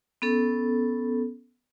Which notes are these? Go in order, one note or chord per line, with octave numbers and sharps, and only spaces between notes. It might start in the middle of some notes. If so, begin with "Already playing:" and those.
B3 C#4 A4